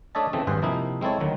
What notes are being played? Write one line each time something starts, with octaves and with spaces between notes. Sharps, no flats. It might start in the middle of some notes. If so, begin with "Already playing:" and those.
A3 D4 C#5 D#5 E5 A5
C#3 E3 A3 C4
G#1 G2 G#4 C5 F#5
C3 F3 A#3 D#4 E4
G#3 C4 E4 A4 C#5
D2 D#3 F#3